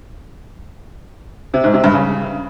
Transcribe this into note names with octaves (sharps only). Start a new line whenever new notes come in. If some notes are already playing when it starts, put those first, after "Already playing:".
C3
G#2
C3
G2
C#3